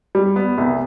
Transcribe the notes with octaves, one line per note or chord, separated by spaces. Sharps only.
G3
B3
C2